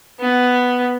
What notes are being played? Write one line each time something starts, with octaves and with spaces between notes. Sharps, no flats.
B3